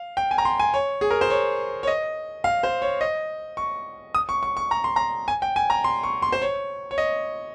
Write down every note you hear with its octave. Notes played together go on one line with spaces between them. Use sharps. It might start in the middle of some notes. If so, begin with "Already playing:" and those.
Already playing: F5
G5
G#5
A#5
C6
G#5
C#5
G#4
A#4
C5
C#5
C#5
D#5
F5
C5
C#5
D#5
C#6
D#6
C#6
C#6
C#6
A#5
C6
A#5
G#5
G5
G#5
A#5
C6
C#6
C6
C5
C#5
C#5
D#5